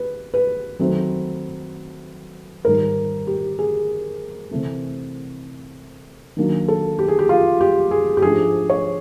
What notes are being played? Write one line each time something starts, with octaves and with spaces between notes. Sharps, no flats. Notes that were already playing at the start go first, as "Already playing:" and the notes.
Already playing: B4
B4
D#3 F#3 A3 C4
G#2 D#3 G3 A#4
G4
G#4
C3 E3 A3 C4
D#3 F#3 A#3 D4
A4
G4
G#4
G4
F4
G4
G#4
G4
G#2 F3 A3 D4 G#4
C#5